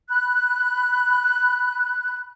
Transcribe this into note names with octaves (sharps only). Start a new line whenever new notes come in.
B5 F#6